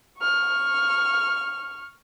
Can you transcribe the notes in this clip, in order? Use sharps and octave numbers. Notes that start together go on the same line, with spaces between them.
C#6 F6